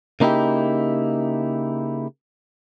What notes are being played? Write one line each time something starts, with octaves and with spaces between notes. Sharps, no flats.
C#3 A#3 D#4 E4 G4